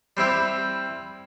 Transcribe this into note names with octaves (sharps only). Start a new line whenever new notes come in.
G3 C4 E4 G4